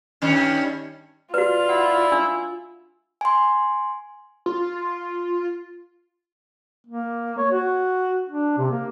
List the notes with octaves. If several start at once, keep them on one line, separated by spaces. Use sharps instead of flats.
G2 D#3 C#4
F4 F#4 B4 D5
E4 F#5
D4 E6
G#5 C6
F4
A#3
C#5
F#4
D4
C3
A#3